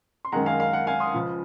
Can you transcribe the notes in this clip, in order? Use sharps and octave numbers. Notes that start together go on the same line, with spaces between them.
C6
F#2 D#3 G#3 F#5 A#5
F5 G#5
F5
F#5
F5 G#5
C6 D#6
C#2 C#3 F3